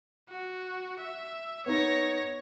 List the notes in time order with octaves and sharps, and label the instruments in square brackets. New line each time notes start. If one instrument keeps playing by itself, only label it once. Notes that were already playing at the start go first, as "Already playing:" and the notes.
[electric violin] F#4
E5
[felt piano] B3 D#4 [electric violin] C#5 A#6